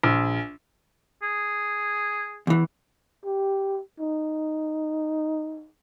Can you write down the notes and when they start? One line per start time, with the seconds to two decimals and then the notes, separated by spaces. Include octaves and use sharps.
0.03 A#1
1.23 G#4
2.47 E2 E3
3.26 G4
4.00 D#4